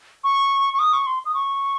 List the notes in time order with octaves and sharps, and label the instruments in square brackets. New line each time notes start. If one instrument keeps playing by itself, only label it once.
[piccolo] C#6
C#6
D#6
C#6
C6
D#6
C#6